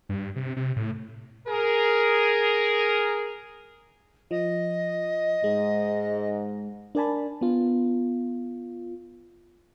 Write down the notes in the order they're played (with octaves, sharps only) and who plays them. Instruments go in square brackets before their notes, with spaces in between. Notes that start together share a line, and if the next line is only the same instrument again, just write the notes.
[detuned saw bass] G2
C3
C3
A2
[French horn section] G#4 A#4
[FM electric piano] F3 [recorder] D#5
[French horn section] G#2 [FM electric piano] G#3
[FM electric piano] D4 A#4 D5 G#5 A5 B5
B3 F4